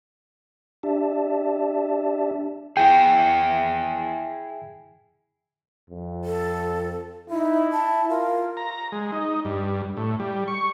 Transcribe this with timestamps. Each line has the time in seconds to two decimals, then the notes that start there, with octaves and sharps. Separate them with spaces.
0.83 D4 G4 D5 E5 A5
2.77 E4 G#4 G5
5.90 F2
6.24 A4
7.30 D#4 E4
7.72 A5
8.09 F4 A#4
8.57 A#5
8.92 G#3
9.12 D#4
9.45 G2
9.97 A2
10.20 G3
10.48 C#6